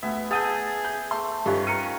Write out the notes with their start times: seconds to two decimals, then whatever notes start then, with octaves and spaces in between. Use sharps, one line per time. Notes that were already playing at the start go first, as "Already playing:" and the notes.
0.03 D2 B3 E5 G#5
0.31 G#4 F#5 A5 D#6 E6 G6 D#7
0.85 G6
1.11 A3 C6
1.46 G2 D#3 C#4 F4 G4 A4 B4
1.67 A#5 F6 C#7 D#7